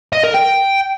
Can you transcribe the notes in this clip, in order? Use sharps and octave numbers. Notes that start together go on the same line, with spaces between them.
D#5
A#4
G5